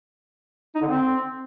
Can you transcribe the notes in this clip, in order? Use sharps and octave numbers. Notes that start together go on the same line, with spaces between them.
D#4
D3
C4